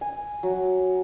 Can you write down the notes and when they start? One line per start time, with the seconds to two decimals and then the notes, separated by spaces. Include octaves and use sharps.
0.01 G#5
0.43 F#3